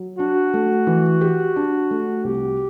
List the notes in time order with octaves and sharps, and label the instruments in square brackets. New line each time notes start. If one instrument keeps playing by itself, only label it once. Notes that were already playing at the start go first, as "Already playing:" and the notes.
Already playing: [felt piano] F#3
[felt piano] D4 [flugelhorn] F#4
[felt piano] A3
E3
G4
D4
A3
[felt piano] C2 [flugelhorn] G4